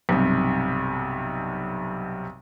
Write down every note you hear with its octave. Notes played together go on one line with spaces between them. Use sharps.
B1 G2 C3